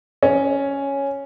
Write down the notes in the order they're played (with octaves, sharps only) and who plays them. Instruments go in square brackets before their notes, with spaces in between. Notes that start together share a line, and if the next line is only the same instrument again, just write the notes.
[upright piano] C#4